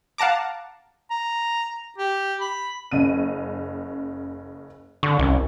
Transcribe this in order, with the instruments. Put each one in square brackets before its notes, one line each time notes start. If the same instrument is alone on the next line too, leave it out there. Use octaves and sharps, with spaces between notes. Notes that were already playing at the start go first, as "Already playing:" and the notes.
[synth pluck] F5 F#5 A5 A#5 D6
[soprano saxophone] A#5
G4
B5
[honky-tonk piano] F#1 C#3 D#7
[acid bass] D3 [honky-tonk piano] C#6
[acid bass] C2 [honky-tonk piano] F#2